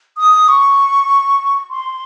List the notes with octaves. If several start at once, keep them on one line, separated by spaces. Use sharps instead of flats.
D#6
C#6
C6